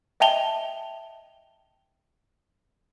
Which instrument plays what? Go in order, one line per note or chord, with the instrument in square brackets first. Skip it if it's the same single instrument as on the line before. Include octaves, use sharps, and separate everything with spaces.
[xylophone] D#5 E5 G5 A5 F7 G7